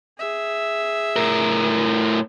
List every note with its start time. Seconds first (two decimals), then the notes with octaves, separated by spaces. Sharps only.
0.19 G#4 E5
1.16 A2 A#4